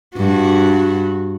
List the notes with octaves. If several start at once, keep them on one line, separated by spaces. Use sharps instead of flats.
G2 F#4